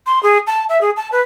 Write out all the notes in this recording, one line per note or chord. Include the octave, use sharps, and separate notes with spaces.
C6
G#4
A5
E5
G#4
A5
B4